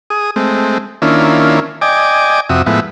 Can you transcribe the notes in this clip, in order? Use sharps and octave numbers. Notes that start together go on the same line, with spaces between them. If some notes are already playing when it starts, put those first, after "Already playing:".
G#4 D#6
G#3 A3 C4
D#3 A#3 C#4 D4 E4 F4
D5 D#5 G5 G#5 D6
F2 C3 F#4 E5 D#6
A2 F3 G#3 B3 E4